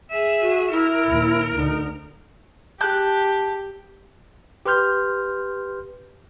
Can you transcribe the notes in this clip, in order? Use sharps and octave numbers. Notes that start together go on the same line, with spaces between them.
G#4 E5
F#4
E4 A#4
D#2 A#2
D2 D3 D#4
G4 A5 F#6 G6
G4 B4 C6 F6 G6